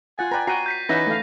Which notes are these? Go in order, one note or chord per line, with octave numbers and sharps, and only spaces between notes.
F4 F#5 G#5 A6
B4 D5 G5 A#5
F#4 F#5 G5 A#5 C7 D#7
G6 B6 C7
E3 C#4 D#4 B4 E5 F#5 A#6
A3 F5